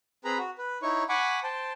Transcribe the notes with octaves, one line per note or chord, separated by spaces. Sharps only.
C4 G#4 B4 A#5 B5
F#4
B4
D#4 E4 C#5 C#6
F#5 G#5 B5 C#6 D6
C5 G5 A5